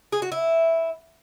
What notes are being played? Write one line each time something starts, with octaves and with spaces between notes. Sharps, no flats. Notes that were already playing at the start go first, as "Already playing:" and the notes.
G#4
F#4
E4